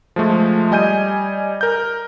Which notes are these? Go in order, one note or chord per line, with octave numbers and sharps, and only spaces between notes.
F3 G#3 A3
G3 D#5 G#5 G6 D#7
A#4 G6